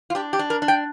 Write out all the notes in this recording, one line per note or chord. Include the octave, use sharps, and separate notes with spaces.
F4
D4 G4
G4
D4
A#4
D4
G5